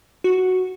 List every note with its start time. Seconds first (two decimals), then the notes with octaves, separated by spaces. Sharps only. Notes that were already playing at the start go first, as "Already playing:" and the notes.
0.24 F#4